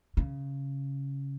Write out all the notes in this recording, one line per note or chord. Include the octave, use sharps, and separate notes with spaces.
C#3